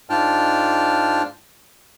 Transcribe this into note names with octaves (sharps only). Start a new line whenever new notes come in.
G#2 D4 F4 G5 A5 F6